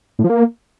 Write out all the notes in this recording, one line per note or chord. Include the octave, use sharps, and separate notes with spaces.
A2
F3
A#3